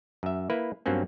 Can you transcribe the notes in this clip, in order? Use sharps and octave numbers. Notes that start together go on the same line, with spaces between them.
F#2 E5
A#3 E4 B4
G2 F#3 A#3 C4 C#4